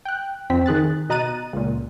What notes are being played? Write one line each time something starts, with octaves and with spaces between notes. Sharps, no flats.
G5 F#6
F2 C4 B6
D#3 G#4 F#6 A6
B2 D#5 A#5 F#6 A6 D#7
C#2 A#2